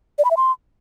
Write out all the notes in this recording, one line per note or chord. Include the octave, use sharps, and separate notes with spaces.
D5
B5
E5
C6